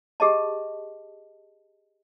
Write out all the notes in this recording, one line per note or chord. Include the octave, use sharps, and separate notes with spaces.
G4 G#4 D#5 A5